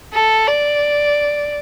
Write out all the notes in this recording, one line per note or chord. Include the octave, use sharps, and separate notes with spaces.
A4
D5